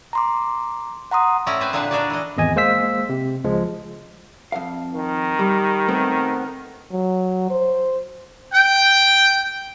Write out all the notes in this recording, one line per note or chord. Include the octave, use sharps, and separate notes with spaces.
A#5 C6 D6
F#5 A#5 C6 D#6
A2 C#4 E4 D5 E5 A#5
C4 G#4 B4 C5
A#2 D3 G#4 B4 F#5
D4 D#4 F#4 G#4 D5
E3 D#5
G#1 E2 D#5 G#5
G#3 A#3 C5 F5 E6 B6
C3
C#2 F3 G#3
F2 F5
D#3
G3
A3 B3 C4
F#3
C5
G5